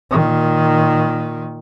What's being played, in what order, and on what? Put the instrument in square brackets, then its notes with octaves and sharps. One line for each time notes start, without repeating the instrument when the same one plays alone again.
[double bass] A#2 D#3